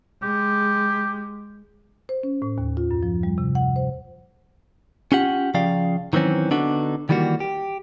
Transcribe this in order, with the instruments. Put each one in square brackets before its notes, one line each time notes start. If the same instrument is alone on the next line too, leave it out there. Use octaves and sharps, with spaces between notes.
[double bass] G#3 [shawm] G4
[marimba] C5
C#4
A2
D#2
F4
F#2
F3
G3
C3
F#5
C5
[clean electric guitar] C#4 F4 G4 F#5
C#3 F3 D5 F5 G5
D#3 E3 F#3 C4 C#4
D3 B3 D4 D#4 F#4
D#3 E3 G3 A#3 F#4
G4